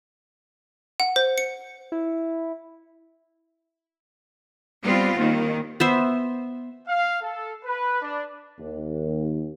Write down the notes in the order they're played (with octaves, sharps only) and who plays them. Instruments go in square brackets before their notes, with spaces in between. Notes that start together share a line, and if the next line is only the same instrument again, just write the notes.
[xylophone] F#5
C5
C#7
[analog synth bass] E4
[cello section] G3 B3 C4 F4
D#2 D#3
[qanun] B3 C5 E5
[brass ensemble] F5
A4
B4
D4
D#2